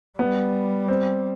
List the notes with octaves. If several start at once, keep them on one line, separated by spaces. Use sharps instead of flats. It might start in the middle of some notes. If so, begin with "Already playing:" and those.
G3 B3
C4